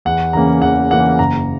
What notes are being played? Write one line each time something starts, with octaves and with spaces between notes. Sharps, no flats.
E2 F#5
C#3 E3 A#3 C#4 A#5
E2 F#5
C#3 E3 A#3 C#4 F#5
F#1 A#5